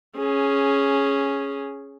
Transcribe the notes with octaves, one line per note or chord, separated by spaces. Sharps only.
C#4 G#4